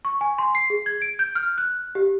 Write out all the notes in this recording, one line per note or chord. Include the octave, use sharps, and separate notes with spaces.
C#6
G#5
C6
C7
G#4
G#6
D7
G6
F6
F#6
G4